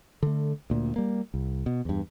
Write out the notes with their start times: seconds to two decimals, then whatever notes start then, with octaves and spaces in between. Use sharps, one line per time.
0.23 D3 A3
0.70 D2 A#2
0.96 G3 A#3
1.34 C2
1.66 B2
1.85 E2 G2